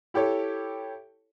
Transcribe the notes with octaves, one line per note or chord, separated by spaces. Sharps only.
E4 G4 A4 C#5